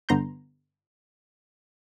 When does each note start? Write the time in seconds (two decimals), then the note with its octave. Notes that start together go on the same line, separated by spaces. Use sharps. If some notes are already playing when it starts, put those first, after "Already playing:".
0.09 G2 D3 B3 A#5 C6 G6